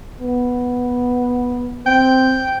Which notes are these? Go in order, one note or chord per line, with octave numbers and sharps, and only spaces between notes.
B3
C4 G5